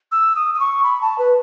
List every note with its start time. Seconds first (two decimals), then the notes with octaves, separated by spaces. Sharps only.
0.12 E6
0.36 D#6
0.55 D#6
0.60 C#6
0.84 B5
1.02 A5
1.18 B4